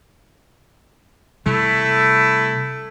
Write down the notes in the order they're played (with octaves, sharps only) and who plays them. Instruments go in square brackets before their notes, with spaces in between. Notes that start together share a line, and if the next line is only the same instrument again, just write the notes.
[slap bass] C3 G3 [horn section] A3 E4